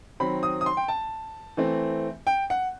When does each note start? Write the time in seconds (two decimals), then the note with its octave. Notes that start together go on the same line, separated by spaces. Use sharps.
0.20 D#3 F#3 C4 B5
0.43 D#6
0.61 D#6
0.66 C6
0.77 G5
0.88 A5
1.57 E3 A3 C4
2.27 G5
2.50 F#5